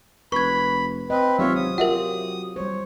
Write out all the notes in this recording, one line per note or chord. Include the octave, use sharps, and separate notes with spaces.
F1 B4 B5 C#6 G#6
C4 B4 D#5
G#1 F#3 C4 F4 G4 C#5 E5
D#6
F#3 F4 G4 A#4 E5 F#5
G3 C5 C#5